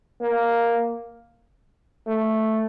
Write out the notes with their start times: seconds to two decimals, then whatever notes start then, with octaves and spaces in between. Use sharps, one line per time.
0.21 A#3
2.07 A3